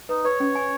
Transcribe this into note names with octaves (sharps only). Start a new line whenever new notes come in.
D#4 B4
B4 C#5
C#4
G#5